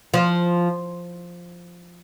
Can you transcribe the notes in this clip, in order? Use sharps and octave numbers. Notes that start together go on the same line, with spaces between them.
F3